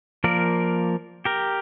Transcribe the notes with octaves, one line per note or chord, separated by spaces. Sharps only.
F3 A#3 A#4 D5
G4 A#4